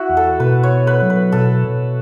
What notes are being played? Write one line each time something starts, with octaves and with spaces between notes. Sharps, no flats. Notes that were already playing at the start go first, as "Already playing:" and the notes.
Already playing: E4 F#4
E2
A4
B2 B4
C#5
B3
B4
F#3
B4
B2 A4
B2